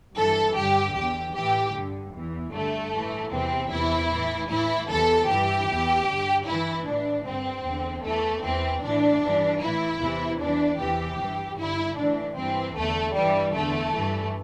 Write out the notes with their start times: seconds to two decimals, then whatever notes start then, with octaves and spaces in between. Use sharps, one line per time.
0.16 G2 E3 A4
0.56 G2 D3 G4
0.95 E2 D3 G4
1.34 A2 E3 G4
1.74 G2 D3
2.14 E2 E3
2.52 G2 D3 A3
2.92 A2 E3
3.31 E2 C3 E3 C4
3.71 E2 C3 E3 E4
4.10 A2 E3
4.49 A2 E3 E4
4.89 E2 C3 E3 A4
5.29 G2 E3 G4
5.68 E2 E3
6.06 G2 D3
6.46 G2 E3 E4
6.85 A2 E3 D4
7.25 G2 D3 C4
7.64 E2 D3
8.03 E2 E3 A3
8.43 E2 E3 C4
8.82 A2 E3 D4
9.22 G2 E3
9.61 A2 E3 E4
10.01 E2 C3 E3
10.40 E2 E3 D4
10.79 E2 C3 E3 G4
11.19 G2 E3
11.58 G2 D3 E4
11.97 A2 E3 D4
12.36 G2 E3 C4
12.76 E2 D3 A3
13.15 G2 E3 G3
13.54 E2 D3 A3
13.94 G2 E3